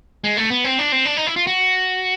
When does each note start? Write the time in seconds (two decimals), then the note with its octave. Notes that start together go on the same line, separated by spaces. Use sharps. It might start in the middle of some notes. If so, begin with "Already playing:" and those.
0.24 G#3
0.37 A3
0.50 B3
0.64 C4
0.79 D4
0.92 C4
1.05 D4
1.17 D#4
1.27 E4
1.36 F4
1.47 F#4